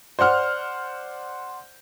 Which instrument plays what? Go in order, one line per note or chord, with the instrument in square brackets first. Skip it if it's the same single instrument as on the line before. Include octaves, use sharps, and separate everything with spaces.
[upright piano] C5 D5 F#5 F6